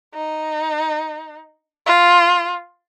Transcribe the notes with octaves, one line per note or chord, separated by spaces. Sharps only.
D#4
F4